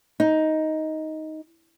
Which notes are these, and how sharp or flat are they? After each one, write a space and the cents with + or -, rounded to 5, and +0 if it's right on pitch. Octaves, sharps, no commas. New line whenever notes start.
D#4 +10